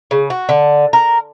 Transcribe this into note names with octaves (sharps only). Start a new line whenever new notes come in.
C#3
F#4
D3
A#4